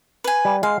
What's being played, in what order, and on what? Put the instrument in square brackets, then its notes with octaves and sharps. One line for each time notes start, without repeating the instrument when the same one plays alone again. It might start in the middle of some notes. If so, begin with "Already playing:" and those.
[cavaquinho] B4 G#5
[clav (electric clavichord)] G3
[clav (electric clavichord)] G#3 [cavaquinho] F5